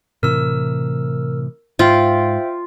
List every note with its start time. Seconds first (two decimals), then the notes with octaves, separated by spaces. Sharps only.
0.23 A2 C3 E3 A#4 E6
1.79 G#2 F4 C5 E5 G5